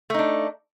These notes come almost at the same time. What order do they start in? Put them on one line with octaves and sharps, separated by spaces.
A3 D#4 D4